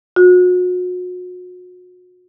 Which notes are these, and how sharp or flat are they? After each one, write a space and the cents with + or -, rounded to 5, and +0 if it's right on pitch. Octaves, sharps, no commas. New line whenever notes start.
F#4 -35